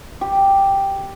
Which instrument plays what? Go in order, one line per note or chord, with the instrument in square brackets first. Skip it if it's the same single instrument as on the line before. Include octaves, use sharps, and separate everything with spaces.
[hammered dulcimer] G4